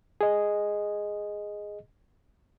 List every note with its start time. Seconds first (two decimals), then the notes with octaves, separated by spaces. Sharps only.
0.21 G#4 D#5